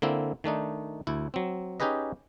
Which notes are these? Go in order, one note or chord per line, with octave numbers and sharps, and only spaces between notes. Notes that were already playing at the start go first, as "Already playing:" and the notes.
D3 A#3 C4 E4
D#3 A3 D4 D#4
D2 E4
F#3 C4
C#4 D#4 G4 G#4 B4 D#5